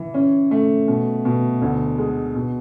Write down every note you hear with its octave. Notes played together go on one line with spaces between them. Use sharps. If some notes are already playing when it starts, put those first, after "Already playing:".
Already playing: E3
C#4
A3
B2
B2
D2
G#3
B2